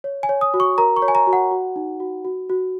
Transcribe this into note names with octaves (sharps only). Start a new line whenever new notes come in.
C#5
G#5
C#5
D#6
F#4
C#6
A#4 A#5
C#6
C#5
G#5
A#5
F#4
F#5
F#4
D#4
F#4
F#4
F#4